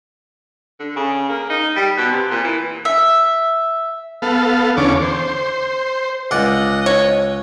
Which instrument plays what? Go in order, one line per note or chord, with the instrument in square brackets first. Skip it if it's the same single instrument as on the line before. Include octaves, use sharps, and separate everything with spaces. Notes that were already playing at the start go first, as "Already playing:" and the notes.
[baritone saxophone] D3
C#3
A#3
D#4
G3
B2
C3
A#2
E3
[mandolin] E5
[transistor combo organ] B3 A4 F5
E2 D3 C#4 C#5 D6
C5
[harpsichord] C#2 D5 F#5 [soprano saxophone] D#5
[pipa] C#5